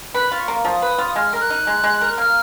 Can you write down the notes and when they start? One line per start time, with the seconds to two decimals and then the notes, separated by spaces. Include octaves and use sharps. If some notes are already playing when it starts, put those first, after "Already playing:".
0.14 B4 B5
0.32 F4
0.39 C#6
0.48 A#3
0.65 F3 D#6
0.82 B4
0.98 F4
1.16 G#3 F6
1.33 A#4
1.41 F#6
1.50 D#4
1.67 G#3
1.84 G#3
2.01 A#4
2.18 A#3 F6